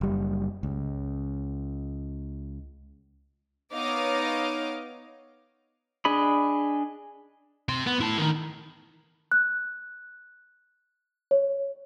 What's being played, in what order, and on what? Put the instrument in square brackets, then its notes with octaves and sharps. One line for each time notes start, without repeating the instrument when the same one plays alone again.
[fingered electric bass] F#1 G3
C#2
[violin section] B3 D#4 C#5 D#5 F5 D6
[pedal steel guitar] D4 G#4 D#5 B5
[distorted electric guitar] G4 C6
B3
E4 A5
D#3 D#4
[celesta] F#6
C#5